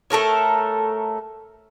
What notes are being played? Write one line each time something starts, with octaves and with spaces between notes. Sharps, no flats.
A3 A4 A#4 C#5